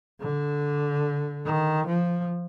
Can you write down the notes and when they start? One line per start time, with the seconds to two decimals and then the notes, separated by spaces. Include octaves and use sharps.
0.21 D3
1.45 D#3
1.86 F3